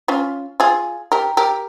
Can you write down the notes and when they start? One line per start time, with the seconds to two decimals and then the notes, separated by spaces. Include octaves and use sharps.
0.08 C#4 F4
0.60 F4 G#4
1.12 G4 A#4
1.37 G4 A#4